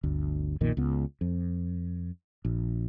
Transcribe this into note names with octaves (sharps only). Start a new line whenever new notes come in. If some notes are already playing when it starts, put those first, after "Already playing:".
G1 D2
B1 F2 A#2 D#3
C#2 B3
F2
A#1